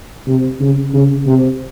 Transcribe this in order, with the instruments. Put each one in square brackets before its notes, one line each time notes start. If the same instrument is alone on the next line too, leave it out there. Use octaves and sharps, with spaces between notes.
[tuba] C3
C#3
C#3
C3